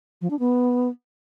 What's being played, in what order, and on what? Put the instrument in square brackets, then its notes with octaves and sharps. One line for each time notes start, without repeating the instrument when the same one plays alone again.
[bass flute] F3
D4
B3